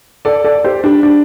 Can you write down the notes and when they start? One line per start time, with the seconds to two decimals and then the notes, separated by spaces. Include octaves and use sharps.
0.25 A4 D5
0.45 A4 D5
0.64 G4 C5
0.84 D4 G4
1.03 D4